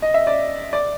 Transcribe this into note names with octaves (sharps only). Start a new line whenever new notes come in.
D#5
E5
D5
D5